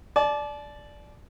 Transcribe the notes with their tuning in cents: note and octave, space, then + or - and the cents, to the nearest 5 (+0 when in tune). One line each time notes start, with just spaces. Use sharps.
D5 +0 A5 -35